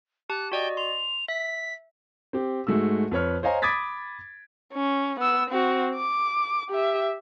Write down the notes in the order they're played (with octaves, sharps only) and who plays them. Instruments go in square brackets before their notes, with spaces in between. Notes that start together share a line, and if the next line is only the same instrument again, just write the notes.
[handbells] G4 A5 [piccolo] F#6
[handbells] F#4 D5 D#5 [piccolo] G5
[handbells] C6 [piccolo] F7
[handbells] E5 [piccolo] B6
[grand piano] C4 G4
G#2 G#3 A3 F#4 E6
F2 B4 C#5 F6
C5 C#5 D#5 F5 G#5 A#5
B5 D6 D#6 G#6 A6 B6
[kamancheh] C#4
B3 E6
C4 F#4
D6
G4 E5